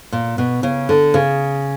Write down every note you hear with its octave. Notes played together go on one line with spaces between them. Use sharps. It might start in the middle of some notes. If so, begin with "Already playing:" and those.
A#2
B2
C#3
D3
C#3